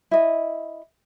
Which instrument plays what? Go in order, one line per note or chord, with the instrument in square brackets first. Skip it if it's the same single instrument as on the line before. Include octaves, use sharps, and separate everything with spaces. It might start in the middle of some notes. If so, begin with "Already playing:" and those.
[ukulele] E4 D#5